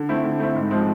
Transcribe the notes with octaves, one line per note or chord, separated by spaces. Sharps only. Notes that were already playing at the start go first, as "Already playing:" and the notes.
Already playing: D3
A3 C4 E4
D3
A3 C4 E4
G#2
F3 G#3 C4